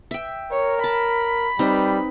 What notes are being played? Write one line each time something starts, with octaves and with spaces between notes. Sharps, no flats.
E5 G5
A#4 C#5
A5 B5
G3 C4 D#4 B4